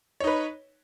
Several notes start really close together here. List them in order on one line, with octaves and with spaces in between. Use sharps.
C#5 D#4 B4